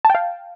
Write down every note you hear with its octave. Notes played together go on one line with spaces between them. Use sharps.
A5
G5
F5